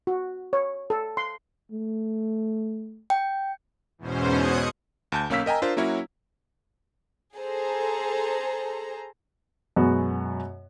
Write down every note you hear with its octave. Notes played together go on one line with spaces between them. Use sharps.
F#4
C#5
A4
C6
A3
G5
E2 G#2 B2 C#4 C5
B2 D#6 F#6 G#6 C#7
D2 A5 G6
B1 A#3 C#4 F5 E6 B6
A#4 D#5 G5 G#5 A#5
D4 F4 A#4 C5
F#3 A#3 C#4 E4 F#4 C#5
G#4 A4 C5 A#5
F#2 B2 G#3 B3 F#4